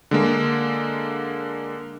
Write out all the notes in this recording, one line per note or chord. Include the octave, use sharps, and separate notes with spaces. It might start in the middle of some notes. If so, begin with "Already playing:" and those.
D3 G#3 A#3